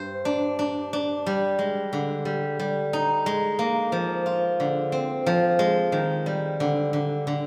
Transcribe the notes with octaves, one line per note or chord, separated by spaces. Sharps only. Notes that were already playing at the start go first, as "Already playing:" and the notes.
Already playing: G2 C5
D4
D4
D4
G3
G#3
D3
G3
G3
D#4
G#3
A#3
F3
F4
D3
C4
F3
G#3
D#3
G3
D3
D3
D3